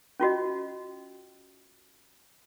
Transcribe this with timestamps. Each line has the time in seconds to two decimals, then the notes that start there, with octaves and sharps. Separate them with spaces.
0.20 C#4 F4 F#4 D#5